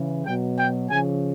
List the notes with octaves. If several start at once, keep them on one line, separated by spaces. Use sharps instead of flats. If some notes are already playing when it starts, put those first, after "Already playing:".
Already playing: C#3 E3
B2 F#3 G5
G5
C#3 F3 G#5